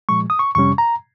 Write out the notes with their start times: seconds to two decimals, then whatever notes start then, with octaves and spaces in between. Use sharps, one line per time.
0.09 A#2 F3 G#3 C#6
0.30 D#6
0.39 C#6
0.55 F2 C3 G3 C#4 C#6
0.78 A#5